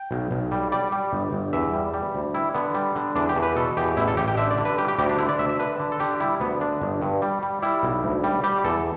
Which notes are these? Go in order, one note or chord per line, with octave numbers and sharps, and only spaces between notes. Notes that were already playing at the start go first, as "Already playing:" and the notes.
Already playing: G5
B1
B1
G3
G3 D5
G3
G1
G1
E2 E5
G3
G3
D2
G3 E4
D3 B3
G3
D3
E2 D4
G4
E2
B4
B2 A4
E2 G4
A1 E4
A4
A1 G4
G5
D3 E5
D5
D3
B4
G3 G4
G4
D2 G4
D4
D3 E4
D5
D2 E5
E5
D3 B4
D3
A4
D3 G4
G3 E4
D2 B3
D3 D4
G1
G2
G3
G3
G3 E4
B1
D2
G3
G3 G4
E2 A4